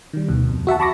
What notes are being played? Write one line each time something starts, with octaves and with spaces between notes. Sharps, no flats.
D#3 G3
D2 B2
F2
F#4 E5 F#5 A5
A5 B5 C#6 D6 A#6